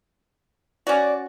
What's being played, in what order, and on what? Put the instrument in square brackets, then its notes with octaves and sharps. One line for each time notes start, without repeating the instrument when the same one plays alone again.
[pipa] C#4 F#4 [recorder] D5